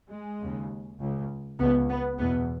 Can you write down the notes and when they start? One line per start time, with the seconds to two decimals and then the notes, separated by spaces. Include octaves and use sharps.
0.10 G#3
0.40 D#2 C#3
1.00 C#2 C#3
1.60 C#2 C#3 B3
1.89 B3
2.19 E2 B2 B3